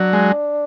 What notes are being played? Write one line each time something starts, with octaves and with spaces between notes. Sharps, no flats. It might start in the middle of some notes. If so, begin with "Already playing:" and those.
Already playing: F#3 D4
G#3